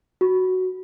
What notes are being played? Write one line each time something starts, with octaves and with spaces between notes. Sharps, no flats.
F#4